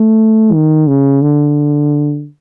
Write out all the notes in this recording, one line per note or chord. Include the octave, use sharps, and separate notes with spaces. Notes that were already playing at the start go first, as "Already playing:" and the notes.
Already playing: A3
D#3
C#3
D3